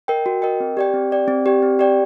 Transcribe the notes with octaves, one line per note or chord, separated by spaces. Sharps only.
A#4 D#5 G5
F#4
A#4 D#5 G5
C4
G4 D5 G5
C4
G4 D5 G5
C4
G4 D5 G5
C4
G4 D5 G5